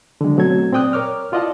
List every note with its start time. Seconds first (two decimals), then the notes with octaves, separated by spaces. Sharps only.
0.21 D3 D#3 F#3 G#3
0.38 B2 F#3 A3 C4 A4 G#6
0.72 A#2 C4 D5 G5 D#6 F#6
0.93 A#4 C#5 D6 F6
1.32 E4 F4 D5 D#5 F#5 A5